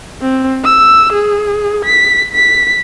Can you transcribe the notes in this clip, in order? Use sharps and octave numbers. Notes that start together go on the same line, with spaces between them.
C4
E6
G#4
B6
B6